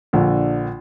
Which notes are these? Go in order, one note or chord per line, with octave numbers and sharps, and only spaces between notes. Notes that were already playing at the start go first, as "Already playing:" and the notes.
A#1 D3